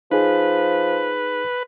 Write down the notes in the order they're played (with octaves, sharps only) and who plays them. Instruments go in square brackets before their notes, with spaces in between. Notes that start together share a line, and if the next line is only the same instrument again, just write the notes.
[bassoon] F3 [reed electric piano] D#4 G#4 [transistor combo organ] B4